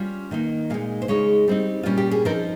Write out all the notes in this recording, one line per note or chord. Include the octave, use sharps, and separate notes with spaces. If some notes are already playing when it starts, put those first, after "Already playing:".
Already playing: G3 C#4 F4
D#3 A#3 D#4
A#2 G#3 D#4 F5
C5
C#3 G#3 D#4 C#5
G3 C4 D#4
A#2 G3 C#4 F4
G4
G#4
F3 C4 D#4 A#4